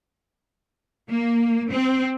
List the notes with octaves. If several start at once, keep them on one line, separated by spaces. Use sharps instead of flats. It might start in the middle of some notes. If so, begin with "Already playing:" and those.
A#3
C4